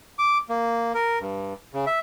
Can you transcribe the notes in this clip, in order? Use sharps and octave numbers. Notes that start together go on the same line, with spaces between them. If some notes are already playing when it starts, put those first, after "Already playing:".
D6
A#3
A#4
G2
C#3
E5